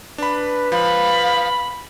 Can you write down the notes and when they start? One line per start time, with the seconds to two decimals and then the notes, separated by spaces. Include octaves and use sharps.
0.18 D4 B4 B5
0.72 F3 F5 B5